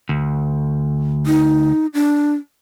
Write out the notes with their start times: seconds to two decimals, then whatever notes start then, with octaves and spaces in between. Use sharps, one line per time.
0.09 D2
1.26 D#4
1.94 D4